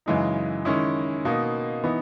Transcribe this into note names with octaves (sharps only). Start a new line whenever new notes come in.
F#2 C#3 E3 G#3 D#4
D#3 G#3 C#4 E4
B2 A#3 D#4
E3 B3 D#4